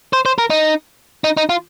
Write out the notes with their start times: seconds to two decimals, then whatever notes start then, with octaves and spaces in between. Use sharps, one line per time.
0.13 C5
0.26 C5
0.38 A#4
0.50 D#4
1.24 D#4
1.37 D#4
1.49 F4